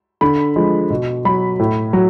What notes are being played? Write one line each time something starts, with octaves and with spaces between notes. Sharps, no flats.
D3 B5
F3 G#3
B2
F#3 B5
A2
F#3